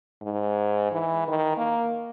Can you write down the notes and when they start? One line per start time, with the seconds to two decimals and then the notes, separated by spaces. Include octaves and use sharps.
0.22 G#2
0.93 E3
1.28 D#3
1.57 A#3